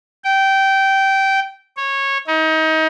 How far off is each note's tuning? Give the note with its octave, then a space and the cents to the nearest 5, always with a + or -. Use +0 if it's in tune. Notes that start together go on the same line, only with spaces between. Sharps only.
G5 -15
C#5 -15
D#4 +30